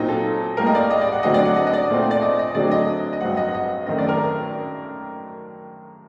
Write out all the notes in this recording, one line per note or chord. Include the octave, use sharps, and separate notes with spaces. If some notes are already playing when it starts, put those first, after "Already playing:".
Already playing: A#2 F#3 C4 D#4
A4
A2 G3 A#3 A#4
D#5
D5
D#5
D5
F#5
D3 F#3 A3 C4 D#5
D5
F#5
D#5
D#5
D5
A#2 A3 C4
D5
D#5
D#5
D3 F#3 A3 C4 D5
D#5
D#5
G2 F#3 C4 F#5
D#5
F#5
D#5
F#2 D#3 A3 C4 D#5
D5
A#4